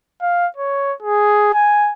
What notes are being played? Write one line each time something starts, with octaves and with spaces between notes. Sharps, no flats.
F5
C#5
G#4
G#5